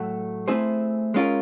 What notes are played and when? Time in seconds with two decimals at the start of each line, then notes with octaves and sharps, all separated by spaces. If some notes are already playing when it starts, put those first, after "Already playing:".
Already playing: A2 F#3 A3
0.48 A3 C4 E4 G#4 C5
1.14 G#3 C#4 F4 A#4